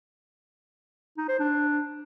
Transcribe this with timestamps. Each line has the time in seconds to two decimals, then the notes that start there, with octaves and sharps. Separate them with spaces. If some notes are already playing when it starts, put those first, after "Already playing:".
1.18 D#4
1.29 C5
1.39 D4